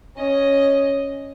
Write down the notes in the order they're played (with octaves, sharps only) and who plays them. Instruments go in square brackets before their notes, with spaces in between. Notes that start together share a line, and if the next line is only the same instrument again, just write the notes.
[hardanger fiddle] C#4 D#5